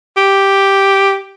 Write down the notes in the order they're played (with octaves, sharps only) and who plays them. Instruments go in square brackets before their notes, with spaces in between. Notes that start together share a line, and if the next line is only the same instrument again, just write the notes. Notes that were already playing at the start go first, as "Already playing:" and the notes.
[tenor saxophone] G4